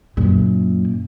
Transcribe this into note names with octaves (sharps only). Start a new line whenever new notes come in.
F#2 A#2